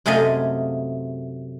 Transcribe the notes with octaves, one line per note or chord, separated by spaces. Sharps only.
F#2 C3 A3 G#4 D#5 F5